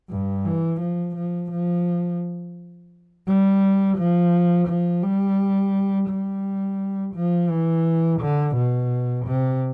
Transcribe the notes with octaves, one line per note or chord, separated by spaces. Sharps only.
G2
E3
F3
F3
F3
G3
F3
F3
G3
G3
F3
E3
D3
B2
C3